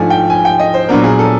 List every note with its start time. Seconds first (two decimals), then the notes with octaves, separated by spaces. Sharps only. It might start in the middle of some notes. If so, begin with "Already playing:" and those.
Already playing: G#2 F3 A3 D4 G#5
0.10 G5
0.30 G#5
0.45 G5
0.60 D#5
0.74 C5
0.89 A#2 F#3 B3 D4 A#4
1.04 G#4
1.19 A4